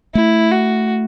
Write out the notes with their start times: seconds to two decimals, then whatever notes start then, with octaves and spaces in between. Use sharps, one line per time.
0.14 A3 E4
0.51 F#4